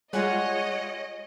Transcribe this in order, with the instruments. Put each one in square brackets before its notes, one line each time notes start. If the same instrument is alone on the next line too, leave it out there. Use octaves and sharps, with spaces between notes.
[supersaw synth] G3 G#3 F4 [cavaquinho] G#4 F#5 [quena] C#5 [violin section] D#5